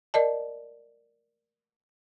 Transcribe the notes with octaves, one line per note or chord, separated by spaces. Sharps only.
A#4 D5 D#5 A5